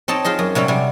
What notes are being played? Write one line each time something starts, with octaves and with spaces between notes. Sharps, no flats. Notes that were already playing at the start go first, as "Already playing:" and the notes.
C4 D#4 C#5 D#5 A5
F4 G#4 C5 D#5
F#2
C3 F#3 G3 C#4
C3 G3